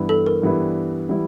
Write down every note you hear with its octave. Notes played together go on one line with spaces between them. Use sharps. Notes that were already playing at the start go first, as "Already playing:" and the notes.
Already playing: G2 E3 G3 B3 E4
A4
A#4
G2 E3 G3 B3 E4
E3 G3 B3 E4